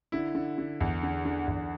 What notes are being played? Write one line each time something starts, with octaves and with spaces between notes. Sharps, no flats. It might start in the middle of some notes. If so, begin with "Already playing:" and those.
D3 E4
D3
D3
E2
D3
D3
E2